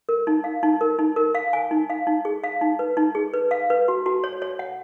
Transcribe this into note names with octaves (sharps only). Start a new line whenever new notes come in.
A#4
D#4
F5
D#4
A#4
D#4
A#4
F5
G#5
D#4
F5
D#4
G#4
F5
D#4
B4
D#4
G#4
B4
F5
B4
F#4
F#4
C#5
C#5
F#5